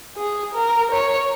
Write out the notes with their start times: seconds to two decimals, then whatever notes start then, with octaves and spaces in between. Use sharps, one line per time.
0.17 G#4
0.55 A#4
0.92 C#5